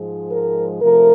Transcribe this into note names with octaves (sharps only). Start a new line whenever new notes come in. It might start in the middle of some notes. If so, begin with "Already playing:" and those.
Already playing: G#2 F3 G#3
A#4
C3 F3 A3 A#4